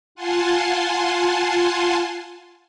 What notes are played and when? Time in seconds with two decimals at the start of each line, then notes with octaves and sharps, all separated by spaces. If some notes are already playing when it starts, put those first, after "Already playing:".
0.15 F4 F#5 G#5 A5 C6